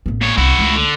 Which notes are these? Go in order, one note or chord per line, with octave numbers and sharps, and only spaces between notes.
A1 B3
A#2 C#5
C2 E4 F#4
C#2 A3
D3